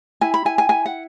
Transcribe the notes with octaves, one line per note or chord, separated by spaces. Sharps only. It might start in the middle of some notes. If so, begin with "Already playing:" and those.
E4 G#5
B5
E4 G#5
G#5
E4 G#5
F#5